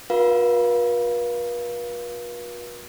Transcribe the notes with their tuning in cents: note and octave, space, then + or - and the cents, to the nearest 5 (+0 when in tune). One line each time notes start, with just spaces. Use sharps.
F#4 -45 B4 -45 F5 -10